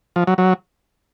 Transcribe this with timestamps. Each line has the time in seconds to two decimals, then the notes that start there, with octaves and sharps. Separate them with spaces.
0.16 F3
0.27 F#3
0.38 F#3